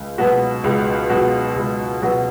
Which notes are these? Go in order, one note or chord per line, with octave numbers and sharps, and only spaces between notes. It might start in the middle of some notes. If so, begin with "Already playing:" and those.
Already playing: C#2
B2 F#3 B3 F#4
C#2
B2 F#3 B3 F#4
C#2
B2 F#3 B3 F#4